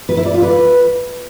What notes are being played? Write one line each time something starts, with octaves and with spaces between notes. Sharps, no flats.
B4
E4
D5
F4
B4